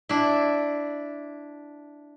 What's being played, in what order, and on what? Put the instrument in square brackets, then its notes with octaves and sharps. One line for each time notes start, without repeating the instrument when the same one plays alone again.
[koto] D4 E4